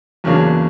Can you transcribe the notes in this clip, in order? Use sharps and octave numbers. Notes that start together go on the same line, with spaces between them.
E2 C#3 F#3 A#3 D4